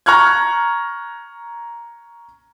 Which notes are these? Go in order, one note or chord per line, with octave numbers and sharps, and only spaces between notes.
A#5 C#6 F6 F#6 G#6